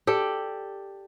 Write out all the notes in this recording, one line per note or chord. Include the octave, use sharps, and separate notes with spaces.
G4 A4 D5